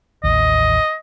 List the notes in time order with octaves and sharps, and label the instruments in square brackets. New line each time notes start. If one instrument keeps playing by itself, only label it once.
[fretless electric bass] A1 D#2 [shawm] D#5